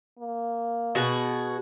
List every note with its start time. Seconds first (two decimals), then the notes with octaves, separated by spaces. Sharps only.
0.19 A#3
0.95 B2 F#4 G#4